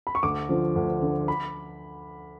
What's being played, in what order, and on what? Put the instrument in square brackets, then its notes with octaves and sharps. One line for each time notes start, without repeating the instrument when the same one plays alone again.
[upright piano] B5
C#6
D2 D6
D3 F3
D2
D3 F3
B5